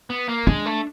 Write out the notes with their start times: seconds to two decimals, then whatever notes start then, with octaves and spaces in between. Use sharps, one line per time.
0.10 B3
0.29 A#3
0.47 G#3 D4
0.66 A3